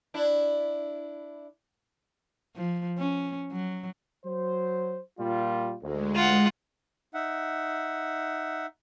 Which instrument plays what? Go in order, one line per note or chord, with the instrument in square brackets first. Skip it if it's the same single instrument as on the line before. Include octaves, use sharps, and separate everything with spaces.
[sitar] D4 E4
[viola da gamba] F3
C#4
F#3
[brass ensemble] F#3 C5
A#2 G3 F4
[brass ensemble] D2 [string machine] G#3
[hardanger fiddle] F4 F#5
[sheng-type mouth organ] D#4 E5 F#5